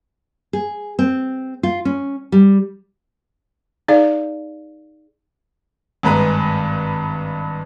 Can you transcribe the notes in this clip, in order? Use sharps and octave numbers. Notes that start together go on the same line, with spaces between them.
G#4
C4
F4
C#4
G3
D#4 G#4 D5 F5
G#1 G2 G#3 B4 A#5